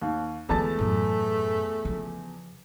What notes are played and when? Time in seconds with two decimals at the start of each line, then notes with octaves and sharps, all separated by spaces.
0.02 D#2
0.49 E2 D3 G#3 A3 A5 A6
0.79 F#2 A2
1.85 F2 C#3